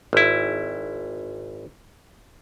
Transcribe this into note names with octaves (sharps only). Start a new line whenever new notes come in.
G#1 E4